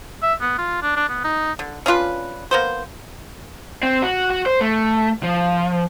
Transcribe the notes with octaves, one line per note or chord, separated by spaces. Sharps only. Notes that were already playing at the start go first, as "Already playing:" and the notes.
E5
B3
F4
D4
D4
B3
D#4
D3
C#4 D4 F4 B4
A#3 B3 C5
C4
F#4
F#4
C5
A3
F3